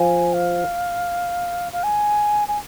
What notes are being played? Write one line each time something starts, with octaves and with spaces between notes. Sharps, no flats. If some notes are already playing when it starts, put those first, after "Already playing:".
Already playing: F3 G#5
F5
F5
G#5
G#5